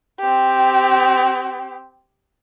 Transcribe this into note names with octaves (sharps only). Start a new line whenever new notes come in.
C4 G4